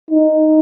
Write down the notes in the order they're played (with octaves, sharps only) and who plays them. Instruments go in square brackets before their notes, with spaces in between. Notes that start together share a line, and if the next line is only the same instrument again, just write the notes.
[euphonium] D#4